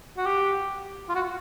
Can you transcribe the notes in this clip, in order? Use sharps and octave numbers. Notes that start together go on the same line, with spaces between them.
F#4
G4
F4
F#4